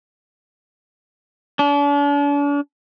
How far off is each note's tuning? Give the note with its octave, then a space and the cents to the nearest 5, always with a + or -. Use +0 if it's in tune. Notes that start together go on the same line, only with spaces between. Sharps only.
D4 -40